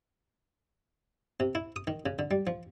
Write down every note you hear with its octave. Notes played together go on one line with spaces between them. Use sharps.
C3
E4
D#6
D#3
C#3
D3
G3
F3